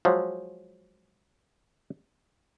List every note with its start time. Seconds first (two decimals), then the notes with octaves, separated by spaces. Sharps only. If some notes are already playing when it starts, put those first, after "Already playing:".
0.05 F3 F#3 G#3